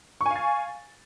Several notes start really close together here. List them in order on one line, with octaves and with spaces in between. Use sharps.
C#6 G#5 F5 A6